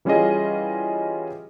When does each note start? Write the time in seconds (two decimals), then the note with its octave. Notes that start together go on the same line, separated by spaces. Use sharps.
0.05 E3 G3 C#4 F4 G#4 D#5